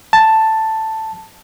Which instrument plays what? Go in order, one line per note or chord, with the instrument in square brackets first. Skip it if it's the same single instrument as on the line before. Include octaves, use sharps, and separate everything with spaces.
[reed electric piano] A5